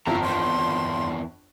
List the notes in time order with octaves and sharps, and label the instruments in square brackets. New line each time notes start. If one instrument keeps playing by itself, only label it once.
[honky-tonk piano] G1 F2 F4 [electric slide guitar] C#3 A#4 A#5 [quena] E4
[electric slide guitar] E2 D#3 [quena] C6